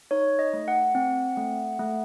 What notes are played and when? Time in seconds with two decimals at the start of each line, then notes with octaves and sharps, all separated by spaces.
0.11 D#4 C#5
0.39 D#5
0.53 A3
0.68 F#5
0.95 C4
1.37 A3
1.79 A3